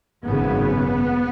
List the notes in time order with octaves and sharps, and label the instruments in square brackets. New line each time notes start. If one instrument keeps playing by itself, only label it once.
[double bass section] G#1 F#2 C#3 B3